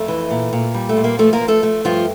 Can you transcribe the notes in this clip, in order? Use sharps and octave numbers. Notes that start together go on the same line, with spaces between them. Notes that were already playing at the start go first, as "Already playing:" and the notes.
Already playing: F2 A3
E3
A#2
A#2
G3
A3
A#2
A#3
F3 A3 A4
A#3 A#4
F3
A3 A4
A3
G2 F3 F4